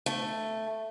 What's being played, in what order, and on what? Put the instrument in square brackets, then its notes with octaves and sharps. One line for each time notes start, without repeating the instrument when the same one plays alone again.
[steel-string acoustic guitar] A3